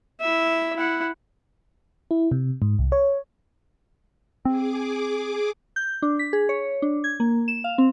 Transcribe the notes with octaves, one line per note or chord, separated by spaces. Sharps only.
E4 E5
E4 F#5
E4
C3
G#2
C2
C#5
C4 G#4 D6
G6
D4
B6
G#4
C#5
D4
G#6
A#3
E7
F5
C4